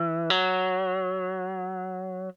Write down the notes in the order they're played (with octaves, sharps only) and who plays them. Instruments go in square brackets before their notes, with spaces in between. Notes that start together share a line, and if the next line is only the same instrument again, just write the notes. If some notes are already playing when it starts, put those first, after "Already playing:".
Already playing: [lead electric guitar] E3
F#3